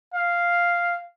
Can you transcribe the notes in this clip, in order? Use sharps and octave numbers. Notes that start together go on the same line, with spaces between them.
F5